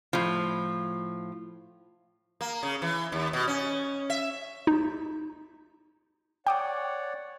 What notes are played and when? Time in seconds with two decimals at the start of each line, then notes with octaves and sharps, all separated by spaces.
0.13 A2 F3
2.41 A#3
2.63 C#3
2.82 E3
3.12 D#2
3.33 B2
3.48 C#4
4.10 E5
4.67 D#4
6.47 C#5 D5 F#5 G5 D6 D#6